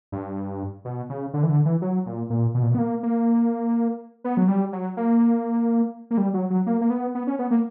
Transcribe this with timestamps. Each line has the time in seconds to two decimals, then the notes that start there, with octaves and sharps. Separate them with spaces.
0.12 G2
0.85 B2
1.09 C#3
1.34 D3
1.43 E3
1.49 D3
1.65 E3
1.82 F#3
2.06 A#2
2.30 A#2
2.54 B2
2.63 A#2
2.71 B2
2.75 B3
2.78 A#3
3.03 A#3
4.24 B3
4.37 F#3
4.48 G3
4.73 F#3
4.97 A#3
6.11 A#3
6.18 G3
6.34 F#3
6.50 F#3
6.66 A#3
6.81 A#3
6.90 B3
7.15 B3
7.27 C#4
7.39 B3
7.51 A#3